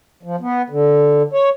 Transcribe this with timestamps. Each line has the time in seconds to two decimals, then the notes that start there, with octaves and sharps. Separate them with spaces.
0.23 F3
0.41 B3
0.70 D3
1.33 C#5